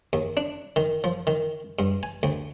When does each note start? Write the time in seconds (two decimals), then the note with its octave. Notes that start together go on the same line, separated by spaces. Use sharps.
0.13 D#2
0.37 D4
0.76 D#3
1.04 F3
1.27 D#3
1.79 G2
2.03 G#5
2.23 D2